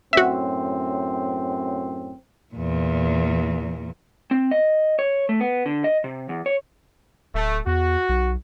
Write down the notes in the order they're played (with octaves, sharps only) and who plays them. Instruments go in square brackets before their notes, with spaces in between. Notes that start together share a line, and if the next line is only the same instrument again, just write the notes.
[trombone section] F#2 A2 C4 [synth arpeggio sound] F#4 E5
[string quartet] E2 A#2
[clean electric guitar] C4
D#5
C#5
A3
B3
D3
D#5
C3
E2
C#5
[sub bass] D1 [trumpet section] A3
[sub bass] E2 [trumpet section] F#4
[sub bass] B1